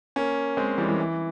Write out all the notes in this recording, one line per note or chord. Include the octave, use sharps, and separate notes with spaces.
A#3 C#4
G#3 C4
E3 G3
E3 G3
E3